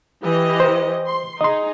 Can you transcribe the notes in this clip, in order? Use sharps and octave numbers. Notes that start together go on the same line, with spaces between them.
E3 G4 D#5
C5
C6
D#4 G#4 D#5 C6